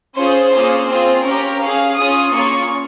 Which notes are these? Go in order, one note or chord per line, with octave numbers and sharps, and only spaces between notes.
C#4 F4 G#4 C5
A#3 C#4 F4 G#4
C4 F4 G#4 C5
C#4 G4 A#4
C#4 G#4 F5
C#4 F4 G#4 D#6
A#3 C#4 F4 G#4 C#6